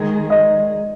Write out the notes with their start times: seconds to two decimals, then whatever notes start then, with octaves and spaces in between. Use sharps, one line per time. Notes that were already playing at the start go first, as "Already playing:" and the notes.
Already playing: D#3 G#3 D#4 G#4
0.30 D#5